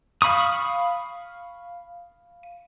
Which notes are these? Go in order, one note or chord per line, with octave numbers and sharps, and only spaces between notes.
F5 B5 C#6 D#6